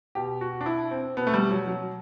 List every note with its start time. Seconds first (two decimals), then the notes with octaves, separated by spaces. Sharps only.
0.15 B2 G4
0.41 F#4
0.61 D4
0.66 E4
0.91 C4
1.17 B2 B3
1.27 A3
1.34 G3
1.51 F#3
1.68 F#3